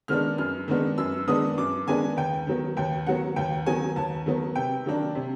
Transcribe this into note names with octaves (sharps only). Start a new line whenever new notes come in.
D#3 G#3 B3 D4 F6
F#2 F6
D#3 G#3 B3 D4
F#2 E6
D#3 G#3 B3 D4 D#6
F#2 D6
D#3 G#3 B3 D4 G#5
D#2 G5
D#3 F#3 B3
D#2 G5
D#3 F#3 B3 F#5
D#2 G5
D#3 F#3 B3 G#5
D#2 A5
D#3 F#3 B3
C3 G5
D#3 F#3 A#3 D4
C3